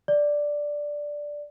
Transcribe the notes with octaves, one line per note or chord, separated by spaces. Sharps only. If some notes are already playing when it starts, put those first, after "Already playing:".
D5